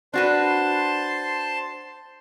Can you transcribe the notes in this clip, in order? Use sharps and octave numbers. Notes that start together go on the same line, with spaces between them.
D4 F#4 B4 C5 A5 C6